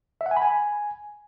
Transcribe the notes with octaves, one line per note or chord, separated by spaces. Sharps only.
E5
F#5
G#5
B5
G#5